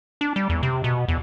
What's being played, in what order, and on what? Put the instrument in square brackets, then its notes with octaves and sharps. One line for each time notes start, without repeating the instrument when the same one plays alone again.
[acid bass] D4
G3
E2
C3
B2
E2